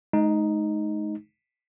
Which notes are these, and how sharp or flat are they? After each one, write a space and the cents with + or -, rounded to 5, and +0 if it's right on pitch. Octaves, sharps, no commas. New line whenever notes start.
G#3 +40 D#4 +0